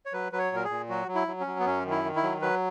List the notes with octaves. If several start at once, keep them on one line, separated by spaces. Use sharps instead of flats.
C#5
F#3 B4
F#3 B4
C#5
A#2 A#4
G#4
A#2
F#3 F#4
F#3
E4
F#3
C#4
F#3
B3
F#2 C#4
D#3
E4
D#3
E4
F#3
F#3 B4